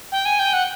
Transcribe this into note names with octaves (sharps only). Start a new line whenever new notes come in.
G5
G#5
G5
F#5